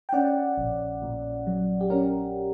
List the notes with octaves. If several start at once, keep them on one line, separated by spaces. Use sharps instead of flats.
G5
C#4 D5 F#5
A#1
A#2
F#3
G4
C#4 A#4